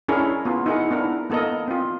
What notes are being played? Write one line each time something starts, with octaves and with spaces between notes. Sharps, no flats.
C#4 D4 E4 G#4 A#4 C#5
B3 F4
D#4 E4 G#4 A#4 D#5 F#5
B3 D4 E4 A#4
A#3 B3 A4 A#4 D#5
C4 F4